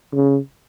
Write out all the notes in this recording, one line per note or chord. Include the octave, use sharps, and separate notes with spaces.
C#3